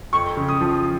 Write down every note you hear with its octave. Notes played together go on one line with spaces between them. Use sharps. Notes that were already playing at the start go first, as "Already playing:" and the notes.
F2 C#6
C#3
D#6
F3